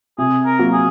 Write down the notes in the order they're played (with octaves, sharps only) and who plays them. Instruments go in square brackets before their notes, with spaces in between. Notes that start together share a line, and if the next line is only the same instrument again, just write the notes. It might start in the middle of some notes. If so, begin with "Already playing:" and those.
[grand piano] C3 [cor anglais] G#4
[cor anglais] A#4
[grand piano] F#3 A#3
[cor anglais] G#4